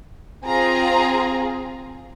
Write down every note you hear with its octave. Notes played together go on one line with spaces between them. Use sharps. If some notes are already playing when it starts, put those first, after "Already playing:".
C4 F4 G#4 A#5